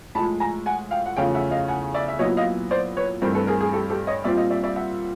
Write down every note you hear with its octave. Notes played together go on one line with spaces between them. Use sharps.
A2 F3 G#3 A5 B5
G#5 A#5
F#5 G#5
F5 G5
F#5
E2 C#3 F3 A3 C#4 F5 G5
E5 F#5
D#5 F5
F#5 G#5
D5 E5
E5
A#2 F#3 B3 E4 C#5 D#5
D#5 F5
C5 D5
B4 C#5
G2 E3 A3 C4 A#4 C5
A4 B4
G#4 A#4
G#4
G4 A4
G4 A4
C#5 D#5
A#2 G3 C4 F4 D5 E5
D#5 F5
D5 E5
D5 E5
E5 F#5